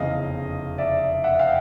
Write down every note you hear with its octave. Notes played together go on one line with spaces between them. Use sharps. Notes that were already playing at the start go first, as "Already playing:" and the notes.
Already playing: F1 E2 C#3 D#5 F5
D5 E5
E5 F#5
F5 G5